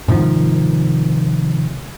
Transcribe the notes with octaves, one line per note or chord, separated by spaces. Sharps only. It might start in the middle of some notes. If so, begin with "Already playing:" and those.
G#2 C3 D#3 F3